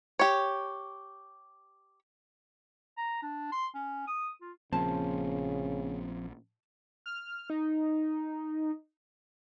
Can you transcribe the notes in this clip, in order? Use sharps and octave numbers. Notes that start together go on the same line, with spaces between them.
G4 C#5
A#5
D4
C6
C#4
D#6
F4
A#1 C#3 F3 A#3 C4 C#4 A5
F6
D#4